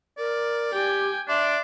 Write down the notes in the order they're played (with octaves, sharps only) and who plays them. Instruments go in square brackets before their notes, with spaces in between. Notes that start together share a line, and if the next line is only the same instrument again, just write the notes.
[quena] A#4 [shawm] D5
[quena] G4 [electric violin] G5 G#5
[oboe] D4 [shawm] D5 [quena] E5 [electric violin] C6